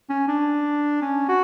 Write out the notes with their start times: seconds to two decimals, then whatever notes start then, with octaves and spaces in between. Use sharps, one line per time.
0.10 C#4
0.28 D4
1.02 C#4
1.29 F#4